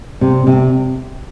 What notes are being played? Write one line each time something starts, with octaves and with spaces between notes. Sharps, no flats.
C3
C3